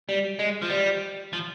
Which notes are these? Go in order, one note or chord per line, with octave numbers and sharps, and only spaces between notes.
G3
G#3
F3
G3
F3